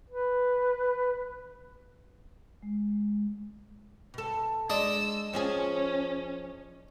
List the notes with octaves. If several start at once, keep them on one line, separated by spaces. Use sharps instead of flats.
B4
G#3
B2 A4
G#3 D4 D5 D#5 A5 E6
F3 C#4 F4 G#4